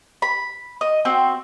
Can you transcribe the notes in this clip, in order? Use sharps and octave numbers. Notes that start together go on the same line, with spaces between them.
B5
D#5
C4 F#4 C5